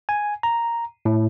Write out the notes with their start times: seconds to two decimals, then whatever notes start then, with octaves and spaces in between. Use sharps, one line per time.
0.09 G#5
0.43 A#5
1.05 A2